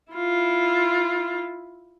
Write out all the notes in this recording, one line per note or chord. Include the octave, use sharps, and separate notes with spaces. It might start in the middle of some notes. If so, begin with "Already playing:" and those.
E4 F4